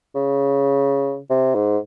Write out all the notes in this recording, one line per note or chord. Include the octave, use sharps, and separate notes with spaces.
C#3
C3
G#2